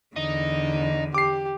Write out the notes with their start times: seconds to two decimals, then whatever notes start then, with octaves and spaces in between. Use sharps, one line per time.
0.16 E2 D3 D#4
1.14 G4 D6 C7